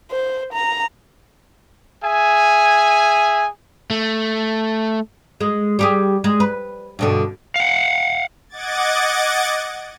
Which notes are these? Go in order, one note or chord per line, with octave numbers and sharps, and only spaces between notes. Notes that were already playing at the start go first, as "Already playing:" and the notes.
C5
A#5
G#4 E5 G#5
A3
G#3
G3 G4 G#4
G#3
B4
G2 B2 D3
F5 F#5
D#5 F#5 D6 G#6 A6